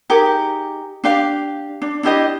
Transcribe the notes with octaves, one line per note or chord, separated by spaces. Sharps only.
D#4 G4 G#4 A#4
D4 G4 F5
D4
D4 E4 G4 D#5